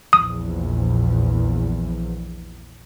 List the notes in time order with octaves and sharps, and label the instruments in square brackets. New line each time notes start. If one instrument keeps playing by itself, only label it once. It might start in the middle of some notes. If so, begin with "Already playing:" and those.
[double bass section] A#1 E2 [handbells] D#6